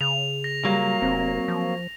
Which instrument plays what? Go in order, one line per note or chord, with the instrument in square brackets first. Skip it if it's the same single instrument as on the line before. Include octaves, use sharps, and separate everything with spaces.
[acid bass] C#3 [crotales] F7
[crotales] A#6
[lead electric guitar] F#3 A#3 [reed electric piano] G3
[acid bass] F1 [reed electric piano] C4
[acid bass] F3